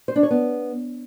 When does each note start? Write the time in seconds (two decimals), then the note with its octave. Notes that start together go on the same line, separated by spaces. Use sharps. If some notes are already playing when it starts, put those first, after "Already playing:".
0.08 C5
0.16 D4
0.23 C#5
0.31 B3